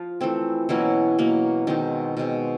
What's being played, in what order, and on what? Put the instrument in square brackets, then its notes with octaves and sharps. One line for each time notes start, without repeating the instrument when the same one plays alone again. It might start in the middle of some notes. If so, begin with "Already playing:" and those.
Already playing: [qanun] F3 F4
E3 A3 C4
B2 E3 F#3 A#3 C#4 E4
B2 F#3 A#3 C#4
B2 D#3 G#3 C4 D#4
B2 G#3 C4